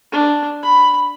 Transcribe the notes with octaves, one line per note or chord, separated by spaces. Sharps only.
D4
B5